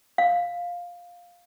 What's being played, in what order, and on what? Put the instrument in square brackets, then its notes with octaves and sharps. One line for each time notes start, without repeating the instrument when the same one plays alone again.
[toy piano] F5